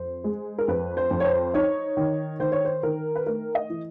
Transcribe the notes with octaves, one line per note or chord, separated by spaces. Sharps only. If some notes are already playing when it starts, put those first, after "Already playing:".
Already playing: F2 C5
G#3
A#4
F2 B4
C5
F2
C#5
C5
D#4 C#5
D#3
D#3 C5
C#5
C5
D#3 A#4
B4
A3 A#4
D#5
E3